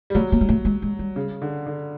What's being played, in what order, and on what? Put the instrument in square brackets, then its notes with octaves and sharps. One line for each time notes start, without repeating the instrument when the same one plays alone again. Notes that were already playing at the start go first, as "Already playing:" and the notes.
[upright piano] G3
[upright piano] F#3 [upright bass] A3
[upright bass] A#3
G#3
A3
G#3
G#3
G3
[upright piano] C#3
D3
D3